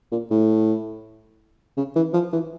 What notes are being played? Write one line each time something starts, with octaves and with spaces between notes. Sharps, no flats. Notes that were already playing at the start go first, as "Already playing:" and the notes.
A#2
A2
C#3
E3
F3
E3